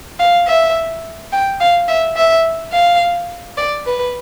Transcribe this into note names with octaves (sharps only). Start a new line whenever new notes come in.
F5
E5
G5
F5
E5
E5
F5
D5
B4